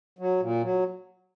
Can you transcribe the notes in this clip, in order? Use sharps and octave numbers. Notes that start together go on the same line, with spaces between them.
F#3
A#2
F#3